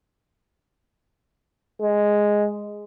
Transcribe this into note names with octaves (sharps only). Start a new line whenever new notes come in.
G#3